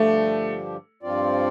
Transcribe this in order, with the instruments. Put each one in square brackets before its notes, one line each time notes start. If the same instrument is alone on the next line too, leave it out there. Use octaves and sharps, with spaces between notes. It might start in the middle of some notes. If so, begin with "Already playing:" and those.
Already playing: [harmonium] G2 D3 F3 D4 G4 [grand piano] A3
[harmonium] G2 F3 C4 F4 D5